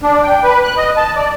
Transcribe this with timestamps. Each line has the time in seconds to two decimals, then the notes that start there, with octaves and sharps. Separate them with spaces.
0.02 D4
0.23 G5
0.43 B4
0.64 F#6
0.77 D#5
0.97 A5
1.16 D5